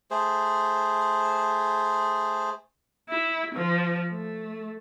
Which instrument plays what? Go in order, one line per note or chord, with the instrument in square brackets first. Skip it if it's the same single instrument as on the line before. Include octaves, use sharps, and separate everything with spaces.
[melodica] A3 G#4 C5
[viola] E4
F3
A3